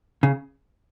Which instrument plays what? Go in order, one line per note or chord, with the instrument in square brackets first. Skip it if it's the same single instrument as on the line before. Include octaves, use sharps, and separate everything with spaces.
[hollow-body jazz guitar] C#3